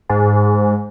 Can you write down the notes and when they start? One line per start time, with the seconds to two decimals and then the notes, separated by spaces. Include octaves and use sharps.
0.09 G#2